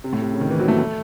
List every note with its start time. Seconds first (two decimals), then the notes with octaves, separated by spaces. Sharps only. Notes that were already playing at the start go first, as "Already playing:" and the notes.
0.04 C3
0.13 A2
0.22 C3
0.32 C#3
0.41 D#3
0.50 E3
0.59 F#3
0.68 A3
0.78 A3